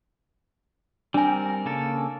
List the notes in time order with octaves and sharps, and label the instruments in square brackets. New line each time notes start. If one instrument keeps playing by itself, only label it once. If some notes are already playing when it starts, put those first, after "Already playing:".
[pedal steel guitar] G3 C4 A#4 [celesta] D4 G#5
[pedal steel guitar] C#3 A#3 A4